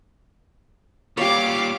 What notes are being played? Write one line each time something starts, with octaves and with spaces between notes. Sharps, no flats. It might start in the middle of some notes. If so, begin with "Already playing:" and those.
A#2 G3 G4 C#5 F5 D6